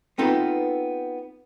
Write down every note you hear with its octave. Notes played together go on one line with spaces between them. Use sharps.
B3 C4 D#4 F4 A4 B4